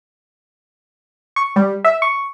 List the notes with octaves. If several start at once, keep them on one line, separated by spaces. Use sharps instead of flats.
C#6
G3
E5
C#6